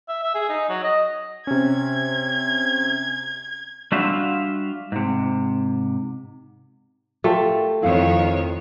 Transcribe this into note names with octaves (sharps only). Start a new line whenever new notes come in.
E5
E5
G#4
D#4
F#3
D#5
C3 C#4 G#6
G3 D4 F4 F#4 E5
G#2 C3
A3 F4 G4 A#4
F2 D#3 E4 C#5 F5